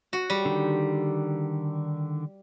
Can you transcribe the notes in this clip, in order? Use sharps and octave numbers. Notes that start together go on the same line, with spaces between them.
F#4
G3
D3 D#3